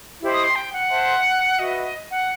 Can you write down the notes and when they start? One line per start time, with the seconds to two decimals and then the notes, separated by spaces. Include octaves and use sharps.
0.21 E4 G4 C5 D#5
0.33 D#6
0.44 C6
0.55 G5
0.73 F#5
0.90 C5 E5 A5 C6
1.59 F#4 B4 D#5 E5
2.11 F#5